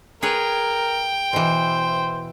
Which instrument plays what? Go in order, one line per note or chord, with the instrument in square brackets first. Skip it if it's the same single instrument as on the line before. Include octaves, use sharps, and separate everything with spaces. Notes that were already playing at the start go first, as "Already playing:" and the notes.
[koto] G#4 B4 C#5 [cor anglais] A#4 [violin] G5
[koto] B2 E3 [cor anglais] C5